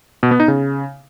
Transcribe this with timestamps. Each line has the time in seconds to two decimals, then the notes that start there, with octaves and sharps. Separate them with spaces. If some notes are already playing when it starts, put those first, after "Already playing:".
0.23 B2
0.31 B3
0.40 D#4
0.48 C#3